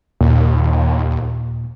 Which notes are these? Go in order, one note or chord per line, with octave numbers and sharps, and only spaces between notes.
D#2 A#2